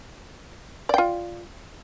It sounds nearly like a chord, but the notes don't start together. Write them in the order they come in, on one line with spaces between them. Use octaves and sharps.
D5 G5 F4